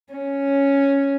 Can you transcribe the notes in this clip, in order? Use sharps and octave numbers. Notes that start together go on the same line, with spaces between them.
C#4